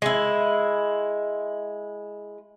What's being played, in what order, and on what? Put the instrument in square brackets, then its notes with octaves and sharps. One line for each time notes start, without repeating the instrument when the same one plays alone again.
[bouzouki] G#3 E4